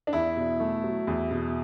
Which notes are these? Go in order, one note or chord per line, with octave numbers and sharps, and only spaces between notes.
D4
E2 E4
B2
A3
F#3
E2
B2